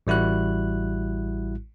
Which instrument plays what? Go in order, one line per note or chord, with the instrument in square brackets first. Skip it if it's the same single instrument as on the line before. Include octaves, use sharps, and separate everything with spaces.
[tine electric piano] A1 G3 E4 F#4 F#6